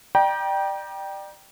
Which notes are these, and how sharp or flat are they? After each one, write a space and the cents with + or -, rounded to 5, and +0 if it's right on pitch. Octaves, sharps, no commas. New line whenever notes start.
D5 +30 G5 -5 A#5 +40